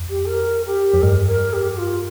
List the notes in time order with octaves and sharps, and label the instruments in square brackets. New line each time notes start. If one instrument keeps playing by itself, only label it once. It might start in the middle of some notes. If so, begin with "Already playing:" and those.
Already playing: [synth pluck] F2
[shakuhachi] G4
A#4
G4
[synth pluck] F2
[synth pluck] G2 [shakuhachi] A#4
[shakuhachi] A#4
G4
F4